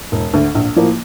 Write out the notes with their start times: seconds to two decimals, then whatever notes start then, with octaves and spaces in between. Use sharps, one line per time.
0.12 E1
0.33 D2 D3
0.55 A#1
0.76 A2 F3 A#3